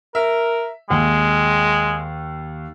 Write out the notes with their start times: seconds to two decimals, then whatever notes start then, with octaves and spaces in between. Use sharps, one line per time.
0.15 A#4 E5
0.90 D#2 G#3